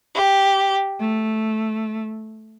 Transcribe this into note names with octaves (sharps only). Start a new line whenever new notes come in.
G4
A3